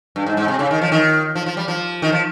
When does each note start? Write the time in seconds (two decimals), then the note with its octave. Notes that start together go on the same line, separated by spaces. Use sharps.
0.16 G2
0.26 G#2
0.37 G#2
0.48 C3
0.59 C#3
0.71 D#3
0.81 F3
0.92 D#3
1.35 F3
1.46 F3
1.57 G3
1.68 F3
2.02 D#3
2.12 F3